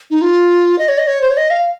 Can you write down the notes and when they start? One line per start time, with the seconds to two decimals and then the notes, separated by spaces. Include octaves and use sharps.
0.11 D#4
0.22 F4
0.79 D#5
0.89 C#5
0.98 D#5
1.07 C#5
1.22 C5
1.31 C#5
1.37 D#5
1.50 F5